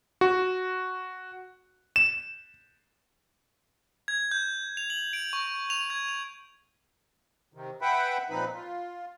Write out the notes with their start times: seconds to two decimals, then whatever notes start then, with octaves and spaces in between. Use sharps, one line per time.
0.21 F#4
1.96 E7
4.08 G#6
4.31 G6
4.77 F7
4.90 F#7
5.13 D7
5.33 C#6
5.70 F7
5.90 G#6
6.08 F7
7.54 C3 D#3
7.81 B4 E5 F#5 G5 B5
8.30 A#2 F3 C4 D#4 B4 B5
8.54 F4